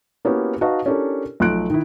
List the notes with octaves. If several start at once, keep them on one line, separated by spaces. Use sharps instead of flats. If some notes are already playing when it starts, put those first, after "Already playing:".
A#3 B3 C#4 E4 F#4 G4
D#4 F#4 B4 D#5 F5 A5
C#4 D4 E4 G4 A4 A#4
B1 F3 A3 C6 F#6 D7
D#3 E4